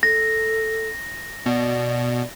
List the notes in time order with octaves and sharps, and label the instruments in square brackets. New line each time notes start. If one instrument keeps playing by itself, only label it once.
[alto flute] A4 [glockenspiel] A#6
[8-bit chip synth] B2 [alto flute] D5